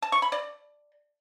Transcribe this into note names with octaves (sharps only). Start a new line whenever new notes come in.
A5
C#6
B5
D5